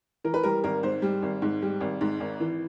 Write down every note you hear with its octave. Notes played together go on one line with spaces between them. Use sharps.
E3 A#4
B4
G3 A#4
G#1 A#4
G#2 C5
G3
G#1
G#2
G3
G#1
G#2
G#1
E3